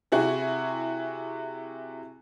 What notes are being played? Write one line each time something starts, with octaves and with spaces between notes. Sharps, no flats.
C3 E4 F#4 G#4